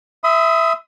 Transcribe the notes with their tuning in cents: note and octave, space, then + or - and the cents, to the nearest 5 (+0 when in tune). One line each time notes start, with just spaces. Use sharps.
E5 +0 B5 +45 D#6 +20